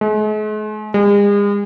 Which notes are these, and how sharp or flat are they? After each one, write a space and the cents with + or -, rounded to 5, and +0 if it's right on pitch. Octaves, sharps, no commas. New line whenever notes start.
G#3 +45
G#3 -40